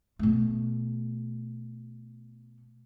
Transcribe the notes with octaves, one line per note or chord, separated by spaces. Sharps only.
B2 A3